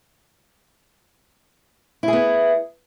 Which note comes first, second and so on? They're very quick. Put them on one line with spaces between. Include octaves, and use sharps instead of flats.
E4 G#4 B3